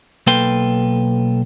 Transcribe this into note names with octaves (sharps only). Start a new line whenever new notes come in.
B1 A#3 A4 B4 G5 C6